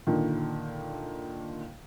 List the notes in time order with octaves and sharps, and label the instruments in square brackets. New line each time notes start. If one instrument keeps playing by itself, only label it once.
[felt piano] A#2 D3 D#3